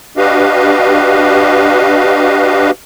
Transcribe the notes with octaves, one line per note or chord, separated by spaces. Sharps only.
D4 F#4 G4 B4 D#5 F5